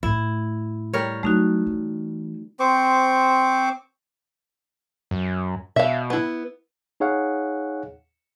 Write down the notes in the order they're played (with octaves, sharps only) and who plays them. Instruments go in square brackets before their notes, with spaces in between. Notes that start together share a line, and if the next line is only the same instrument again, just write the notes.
[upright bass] A2 A3 [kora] E4
[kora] G3 A#4 C#5
[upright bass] F#3 [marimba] A3 D#4 F#4
[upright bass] E3
[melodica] C4 C5 C#6 D6
[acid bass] F#2
[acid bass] B2 [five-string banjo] E5 F5
[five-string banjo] B3 E4
[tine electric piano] D#4 G#4 C#5 F5 F#5